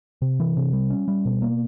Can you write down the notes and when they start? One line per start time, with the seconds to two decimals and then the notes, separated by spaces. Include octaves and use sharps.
0.22 C3
0.40 E3
0.57 C3
0.73 G3
0.90 C#4
1.08 G3
1.25 B2
1.42 A#3